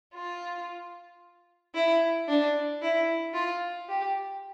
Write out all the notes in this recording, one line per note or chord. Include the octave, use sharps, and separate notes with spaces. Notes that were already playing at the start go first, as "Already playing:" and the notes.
F4
E4
D4
E4
F4
G4